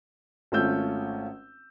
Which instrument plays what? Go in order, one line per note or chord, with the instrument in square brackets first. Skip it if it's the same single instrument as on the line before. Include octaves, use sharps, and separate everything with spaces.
[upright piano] G#1 A3 C#4 F4 E6 G6